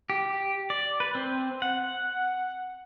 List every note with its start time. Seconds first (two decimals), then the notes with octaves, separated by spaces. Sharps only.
0.10 G4
0.70 D5
1.00 B4
1.15 C4
1.62 F#5